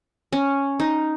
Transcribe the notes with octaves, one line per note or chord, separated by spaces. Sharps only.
C#4
D#4